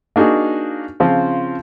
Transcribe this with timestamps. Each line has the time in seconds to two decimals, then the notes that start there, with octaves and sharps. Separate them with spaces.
0.16 A#3 D4 D#4 F#4 G#4
1.00 C#3 F3 C4 F4